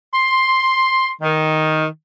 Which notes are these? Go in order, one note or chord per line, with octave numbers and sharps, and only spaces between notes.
C6
D#3